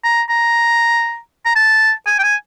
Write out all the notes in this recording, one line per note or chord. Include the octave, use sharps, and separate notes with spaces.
A#5
A#5
A#5
A5
G#5
G5
G#5